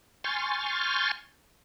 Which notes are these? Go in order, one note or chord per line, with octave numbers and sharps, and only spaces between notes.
G#5 C6 C#6 F6 G6 A6